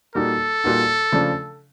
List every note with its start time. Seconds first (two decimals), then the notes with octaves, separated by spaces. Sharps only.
0.15 A#2 G3 A#3 D#4 F#4 A4
0.64 A#2 G3 A#3 D#4 F#4
1.12 C#3 F3 A3 D4